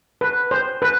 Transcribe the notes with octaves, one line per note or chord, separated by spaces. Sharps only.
B4
C5
B4